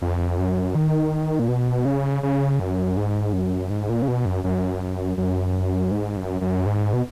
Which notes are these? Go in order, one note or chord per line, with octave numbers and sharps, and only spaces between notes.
F2
F#2
D#3
A#2
B2
C#3
C#3
F#2
G#2
F#2
G#2
A#2
C#3
B2
F#2
F#2
F#2
G#2
F#2
F#2
G#2
B2